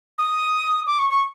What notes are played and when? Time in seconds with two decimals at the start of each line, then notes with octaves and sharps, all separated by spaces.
0.18 D#6
0.87 D6
0.99 C#6
1.10 C#6